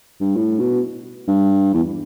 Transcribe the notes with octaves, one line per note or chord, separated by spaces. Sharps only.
G2
A2
B2
G2
E2